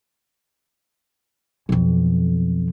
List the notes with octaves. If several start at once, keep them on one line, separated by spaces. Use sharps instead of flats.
B1 F2